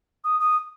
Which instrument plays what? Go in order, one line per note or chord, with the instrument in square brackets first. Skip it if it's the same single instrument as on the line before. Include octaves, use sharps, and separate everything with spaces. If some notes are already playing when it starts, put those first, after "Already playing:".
[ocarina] D#6
D#6